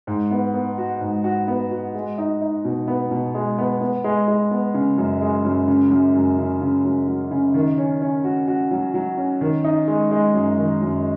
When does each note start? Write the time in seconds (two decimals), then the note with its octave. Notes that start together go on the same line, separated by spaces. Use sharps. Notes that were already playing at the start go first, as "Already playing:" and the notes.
0.07 G#2
0.31 B3
0.54 B3
0.78 F#4
1.01 G#2
1.24 F#4
1.48 B3
1.71 F#4
1.94 G#3
2.18 D#4
2.41 D#4
2.65 B2
2.87 B3
3.11 B2
3.34 G#3
3.58 B3
3.81 B3
4.04 G#3
4.28 G#3
4.51 B3
4.74 C#3
4.98 F#2
5.21 G#3
5.44 F#2
5.67 C#3
5.91 F#2
6.15 F#2
6.38 C#3
6.61 C#3
6.85 F#2
7.07 F#3
7.31 C#3
7.54 D#3
7.78 C#4
8.02 C#4
8.24 F#4
8.48 F#4
8.71 F#3
8.94 F#3
9.17 C#4
9.41 D#3
9.64 D#4
9.87 G#3
10.11 G#3
10.34 F#2
10.58 D#3
10.81 F#2